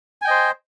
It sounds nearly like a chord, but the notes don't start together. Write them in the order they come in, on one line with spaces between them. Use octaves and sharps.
G#5 G5 D#5 C5